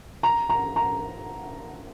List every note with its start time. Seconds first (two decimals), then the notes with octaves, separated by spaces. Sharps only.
0.23 A#5
0.49 A#5
0.76 A#5